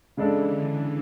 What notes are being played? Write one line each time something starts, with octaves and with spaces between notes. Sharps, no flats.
C#3 E3 G#3 D4 A4
D3